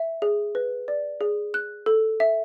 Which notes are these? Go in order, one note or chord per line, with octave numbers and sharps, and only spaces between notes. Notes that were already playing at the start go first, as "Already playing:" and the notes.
Already playing: E5
G#4
B4
D5
G#4
F#6
A4
E5